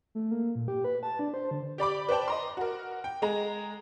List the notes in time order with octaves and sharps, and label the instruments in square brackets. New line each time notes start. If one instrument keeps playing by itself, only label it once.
[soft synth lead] A3
A#3
A#2
G4
B4
A5
D4
C5
D3
[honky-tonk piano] G4 D5 B5 D6
B4 C5 D5 G5 A5
D#5 A#5 C6
F#4 A#4
G5
G#3 G#4 A#5